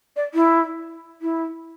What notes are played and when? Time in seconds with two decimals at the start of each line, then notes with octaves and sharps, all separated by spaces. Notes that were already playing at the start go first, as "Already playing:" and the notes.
0.16 D5
0.34 E4
1.22 E4